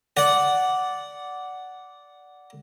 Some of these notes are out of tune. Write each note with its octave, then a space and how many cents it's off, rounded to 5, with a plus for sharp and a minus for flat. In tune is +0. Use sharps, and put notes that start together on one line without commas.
D5 -10 F#5 +0